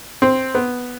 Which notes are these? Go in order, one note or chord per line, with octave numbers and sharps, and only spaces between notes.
C4
B3